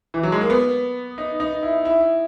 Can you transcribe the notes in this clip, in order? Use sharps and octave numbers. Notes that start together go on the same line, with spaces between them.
E3
F#3
G#3
A#3
B3
D#4
D#4
E4
E4